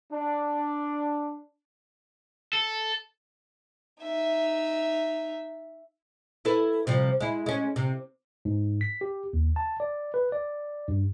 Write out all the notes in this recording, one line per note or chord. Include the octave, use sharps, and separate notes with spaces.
D4
A4
D#4 E5
E4 A4 B4
C3 F3 G3
G#3 E4
G#3 C#4
C3
G#2
B6
G4
D#2
A5
D5
B4
D5
G2